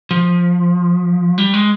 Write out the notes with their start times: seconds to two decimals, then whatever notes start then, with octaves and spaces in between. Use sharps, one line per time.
0.11 F3
1.38 G3
1.54 G#3